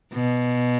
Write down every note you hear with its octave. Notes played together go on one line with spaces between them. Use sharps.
B2